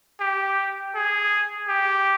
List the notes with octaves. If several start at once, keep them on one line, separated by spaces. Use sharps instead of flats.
G4
G#4
G4